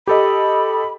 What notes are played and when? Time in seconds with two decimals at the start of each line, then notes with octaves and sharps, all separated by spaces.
0.07 G4 A4 D#5 B5